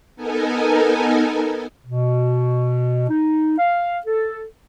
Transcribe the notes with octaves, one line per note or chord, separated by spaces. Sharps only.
B3 D#4 A4 A#4 G#5
B2
D#4
F5
A4